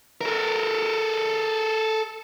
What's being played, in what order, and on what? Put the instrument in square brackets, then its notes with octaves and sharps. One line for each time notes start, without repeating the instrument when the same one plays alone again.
[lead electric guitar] A4 A#4